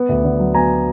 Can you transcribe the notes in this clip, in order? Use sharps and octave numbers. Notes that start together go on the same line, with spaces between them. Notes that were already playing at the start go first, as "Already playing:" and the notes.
Already playing: B3
D2
D3
F#3
B3 G#5 A#5